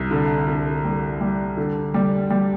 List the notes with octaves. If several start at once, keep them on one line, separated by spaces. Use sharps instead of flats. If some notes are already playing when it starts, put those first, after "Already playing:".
Already playing: C2
D3
D3
G3
G3
D3
G3
G3